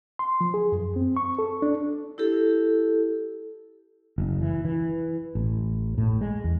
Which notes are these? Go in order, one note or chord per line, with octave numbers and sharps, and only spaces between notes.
C6
F3
G#4
F#2
C4
C#6
A4
D4
E4 G4 A4
F#1
E3
E3
A1
A2
G#3
E2